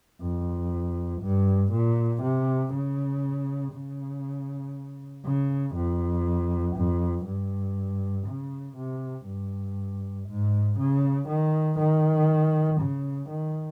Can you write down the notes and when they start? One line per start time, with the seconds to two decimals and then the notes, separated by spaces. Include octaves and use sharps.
0.22 F2
1.21 G2
1.72 A#2
2.22 C3
2.73 C#3
3.74 C#3
5.25 C#3
5.75 F2
6.76 F2
7.26 G2
8.27 C#3
8.77 C3
9.27 G2
10.28 G#2
10.79 C#3
11.28 D#3
11.79 D#3
12.80 C#3
13.30 D#3